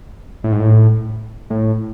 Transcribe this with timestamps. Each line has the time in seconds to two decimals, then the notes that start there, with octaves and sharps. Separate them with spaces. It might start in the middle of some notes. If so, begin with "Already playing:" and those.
0.44 A2
0.52 G#2
0.60 A2
1.50 A2